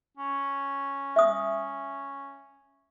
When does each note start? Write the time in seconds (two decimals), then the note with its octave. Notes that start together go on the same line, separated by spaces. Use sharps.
0.17 C#4
1.16 E5 D#6